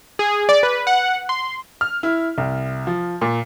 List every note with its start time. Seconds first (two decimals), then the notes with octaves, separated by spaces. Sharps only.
0.19 G#4
0.49 D5
0.63 B4
0.87 F#5
1.29 C6
1.81 F6
2.03 E4
2.38 C2
2.87 F3
3.21 A#2